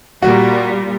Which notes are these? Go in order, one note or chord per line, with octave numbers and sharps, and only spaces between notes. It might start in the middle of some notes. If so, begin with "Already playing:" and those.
A#2 G3 F#4